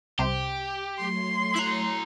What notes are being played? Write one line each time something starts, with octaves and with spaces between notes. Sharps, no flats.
C2 C3 G4 C5 D6
F#3 A3 C#5 C6
E4 A#5 F#6 G#6 C7